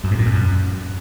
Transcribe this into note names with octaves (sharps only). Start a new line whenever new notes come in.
F#2
G#2
A#2
F2
F#2